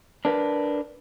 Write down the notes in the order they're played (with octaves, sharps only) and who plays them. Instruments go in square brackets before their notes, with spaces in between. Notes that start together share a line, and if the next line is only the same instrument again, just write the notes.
[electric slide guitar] D4 A#4 B4